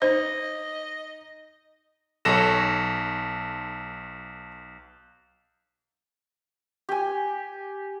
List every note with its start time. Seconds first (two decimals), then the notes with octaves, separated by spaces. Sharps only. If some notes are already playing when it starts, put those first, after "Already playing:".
0.02 D#4 C5 D#5
2.25 B1 A4 C#5 A#6 E7
6.89 G4 G#5